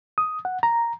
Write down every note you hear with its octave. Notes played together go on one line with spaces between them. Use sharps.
D#6
F#5
A#5